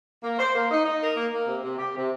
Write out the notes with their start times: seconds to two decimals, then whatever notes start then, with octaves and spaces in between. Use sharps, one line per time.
0.23 A#3
0.39 C5
0.55 A#3
0.71 D#4
0.85 D#4
1.01 A#4
1.16 A#3
1.32 A#3
1.48 C3
1.63 C3
1.78 G4
1.95 C3